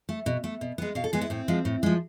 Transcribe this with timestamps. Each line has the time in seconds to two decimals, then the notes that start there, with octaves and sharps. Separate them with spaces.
0.09 A3
0.26 B2
0.44 A3
0.61 B2
0.78 G#3 B3
0.95 B2 F5
1.04 A4
1.13 G#3 B3 G#4
1.21 E4
1.30 A2 C4
1.48 F3 G#3
1.65 A2
1.83 F3 G#3